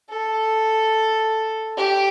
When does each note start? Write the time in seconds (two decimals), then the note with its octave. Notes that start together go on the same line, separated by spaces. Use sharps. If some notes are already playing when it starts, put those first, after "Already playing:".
0.10 A4
1.77 G4